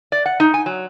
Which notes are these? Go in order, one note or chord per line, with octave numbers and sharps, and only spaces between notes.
D5
F#5
D#4
G#5
F#3